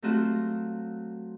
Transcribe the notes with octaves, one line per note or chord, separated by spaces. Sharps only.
F#3 A3 C4 F4 F#4